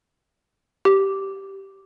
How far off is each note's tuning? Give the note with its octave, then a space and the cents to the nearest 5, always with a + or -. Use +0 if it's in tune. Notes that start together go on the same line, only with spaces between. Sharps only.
G4 -10